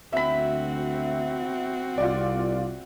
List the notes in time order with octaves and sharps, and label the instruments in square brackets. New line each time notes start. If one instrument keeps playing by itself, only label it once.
[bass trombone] D2 [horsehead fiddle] C4 F#4 [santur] E5 B5
[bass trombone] C2 [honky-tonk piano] F4 D5